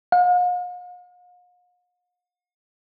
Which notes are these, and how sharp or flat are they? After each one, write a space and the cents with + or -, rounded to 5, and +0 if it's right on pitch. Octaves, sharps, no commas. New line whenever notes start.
F5 +45